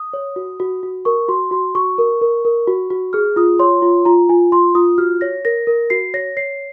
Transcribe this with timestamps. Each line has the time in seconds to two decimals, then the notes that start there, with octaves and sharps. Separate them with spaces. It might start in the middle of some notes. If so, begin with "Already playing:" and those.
Already playing: D#6
0.13 C#5
0.36 F#4
0.60 F#4
0.83 F#4
1.05 A#4 C#6
1.28 F#4 C6
1.51 F#4 C6
1.75 F#4 C#6
1.98 A#4
2.22 A#4
2.45 A#4
2.68 F#4
2.90 F#4
3.13 G#4 F6
3.36 F4 D#6
3.59 C#5 C6
3.82 F4
4.05 F4 A#5
4.29 F4 G#5
4.52 F4 C6
4.75 F4 D#6
4.98 F#4 F6
5.21 C#5 A#6
5.45 A#4 A#6
5.67 A#4
5.90 F#4 C7
6.14 C#5 A#6
6.37 C#5 C7